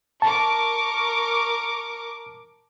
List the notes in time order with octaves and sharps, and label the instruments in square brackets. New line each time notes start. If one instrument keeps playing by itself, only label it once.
[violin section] A#4 C#6 D6 [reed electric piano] A5